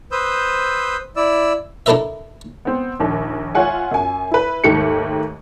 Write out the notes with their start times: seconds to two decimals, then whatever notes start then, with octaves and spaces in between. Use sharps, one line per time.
0.12 B4 C5 D#6 E6 G6
1.16 E4 D5 E6
1.86 D4 E4 A4 A#4 D#5 E5
2.65 B3 C4
3.00 A#1 D#2
3.55 F4 C#5 E5 F#5 G#5
3.91 F#2 G#5
4.31 E4 B4
4.64 D#2 G#2 A3 G4 C#7